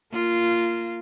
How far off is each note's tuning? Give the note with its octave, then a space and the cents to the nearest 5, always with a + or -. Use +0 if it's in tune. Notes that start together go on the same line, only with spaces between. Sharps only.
A#3 -10 F4 -15